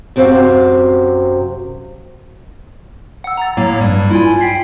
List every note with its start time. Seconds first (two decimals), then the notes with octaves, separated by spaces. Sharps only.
0.16 F#2 C3 C4 F#4 F5
3.24 F#5 E6
3.37 A#5 A6
3.57 A2 F#3 A#3
3.81 G2 G3
4.11 E4 F4 G#5
4.41 G5 B6 C7